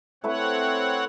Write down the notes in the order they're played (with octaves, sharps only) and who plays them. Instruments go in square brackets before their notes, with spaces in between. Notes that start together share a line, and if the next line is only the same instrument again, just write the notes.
[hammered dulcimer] A3 E4 B4 [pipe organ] C4 C#5 F#5